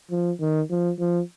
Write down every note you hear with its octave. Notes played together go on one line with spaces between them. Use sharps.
F3
D#3
F3
F3